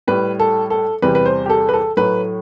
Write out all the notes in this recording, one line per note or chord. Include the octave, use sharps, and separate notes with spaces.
A2 G3 B4
A4
A4
E2 C3 G3 B4
B4
C5
G4
A4
B4
A4
A2 F#3 A3 B4